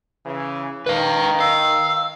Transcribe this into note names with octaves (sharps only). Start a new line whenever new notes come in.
C#3 E3
D#3 B4 F5
F5 E6